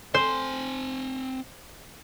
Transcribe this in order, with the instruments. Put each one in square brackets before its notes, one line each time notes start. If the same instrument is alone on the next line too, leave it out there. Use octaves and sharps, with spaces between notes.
[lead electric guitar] C4 G#5 [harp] C5